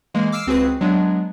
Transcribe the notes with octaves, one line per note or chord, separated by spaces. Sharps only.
E3 G#3 A#3
D6 E6 F6 C7 D7 E7
C#2 C4 F#4 G#4 B4 C7
F#3 G#3 B3 D4